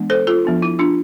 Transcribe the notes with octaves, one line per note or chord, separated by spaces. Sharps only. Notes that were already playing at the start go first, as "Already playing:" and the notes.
Already playing: E3 G#3 B3 D4
A4 C5
F4 A4
F3 B3 D4
E4
D4 F4